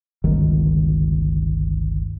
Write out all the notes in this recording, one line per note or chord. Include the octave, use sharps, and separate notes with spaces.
G1 C#2 D#3